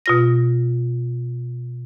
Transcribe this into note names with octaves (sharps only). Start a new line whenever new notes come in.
B2 F4 A#6